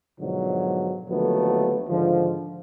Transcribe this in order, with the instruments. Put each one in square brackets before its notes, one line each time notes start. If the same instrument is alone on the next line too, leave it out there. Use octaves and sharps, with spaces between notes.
[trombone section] G#2 B2 D3 F3 F#3
D#2 D3 F3 F#3 A3 B3
G#2 D3 D#3 F3